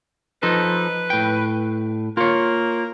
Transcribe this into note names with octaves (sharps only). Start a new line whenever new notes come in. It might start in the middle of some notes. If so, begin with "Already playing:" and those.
F3 D#4 A4 B4
A2 G5
A#3 F4 C#5